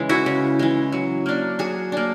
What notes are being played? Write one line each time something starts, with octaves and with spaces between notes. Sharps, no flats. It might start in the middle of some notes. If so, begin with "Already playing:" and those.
Already playing: C#3 E3 G#3
E4 F#4
C#3
E3 G#3
F#3
A#3 D4
F#3 F#4 G#4
A#3 D4